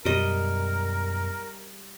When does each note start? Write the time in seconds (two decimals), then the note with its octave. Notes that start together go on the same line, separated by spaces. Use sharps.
0.05 F#2 B2 G3 A#4 D#5